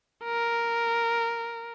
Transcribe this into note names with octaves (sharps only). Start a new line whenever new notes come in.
A#4